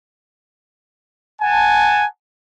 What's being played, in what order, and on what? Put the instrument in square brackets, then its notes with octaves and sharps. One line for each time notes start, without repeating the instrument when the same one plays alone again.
[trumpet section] F#5 G#5 A5